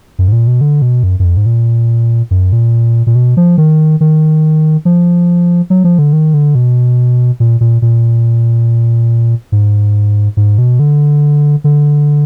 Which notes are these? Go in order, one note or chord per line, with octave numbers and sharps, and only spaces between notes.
F#2
G#2
A#2
B2
D3
B2
F#2
F#2
F2
G#2
A#2
F#2
A#2
A#2
B2
F3
D#3
D#3
F3
F#3
F3
D3
D#3
D3
B2
A#2
A#2
A#2
G#2
G#2
B2
D3
D3